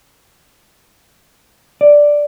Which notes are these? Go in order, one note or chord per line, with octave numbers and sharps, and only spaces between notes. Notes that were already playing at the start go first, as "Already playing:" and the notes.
D5